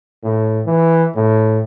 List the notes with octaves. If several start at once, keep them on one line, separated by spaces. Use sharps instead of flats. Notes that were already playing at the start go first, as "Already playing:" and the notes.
A2
E3
A2